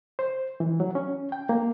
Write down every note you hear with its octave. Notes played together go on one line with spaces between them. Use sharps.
C5
E3
F#3
C#4
G5
A#3